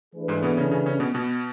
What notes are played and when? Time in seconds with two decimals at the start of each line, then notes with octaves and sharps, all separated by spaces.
0.15 E3 A3 D4 G#4 B4
0.28 G#2 G#3
0.43 B2 B3
0.57 C#3 C#4
0.71 C#3 C#4
0.86 C#3 C#4
1.00 B2 B3
1.14 B2 B3